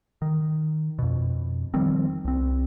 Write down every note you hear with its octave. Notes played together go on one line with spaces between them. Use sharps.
D#3
F2 B2
D#3 F3 G3 C4
C2 C4